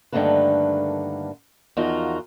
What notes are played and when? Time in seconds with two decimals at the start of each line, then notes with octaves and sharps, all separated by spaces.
0.12 G2 D3 D#3 A3 A#3 B4
1.77 E2 F3 D#4 F4 F#4 A#4